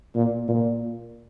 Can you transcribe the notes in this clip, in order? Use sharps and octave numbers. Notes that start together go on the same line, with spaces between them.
A#2
A#2